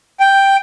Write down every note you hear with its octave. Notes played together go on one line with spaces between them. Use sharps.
G5